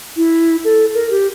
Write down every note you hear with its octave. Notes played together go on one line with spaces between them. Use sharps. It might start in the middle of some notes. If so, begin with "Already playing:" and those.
E4
A4
A#4
G4